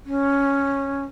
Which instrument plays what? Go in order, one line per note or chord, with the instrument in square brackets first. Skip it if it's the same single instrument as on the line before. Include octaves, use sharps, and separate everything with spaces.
[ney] C#4